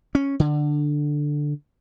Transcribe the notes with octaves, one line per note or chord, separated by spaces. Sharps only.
C#4
D3